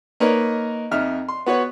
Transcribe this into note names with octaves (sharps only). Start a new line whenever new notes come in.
A#3 D#4 A#4 B4 C#5 D#5
F2 D#4 E5 F6
C6
B3 F#4 B4 C#5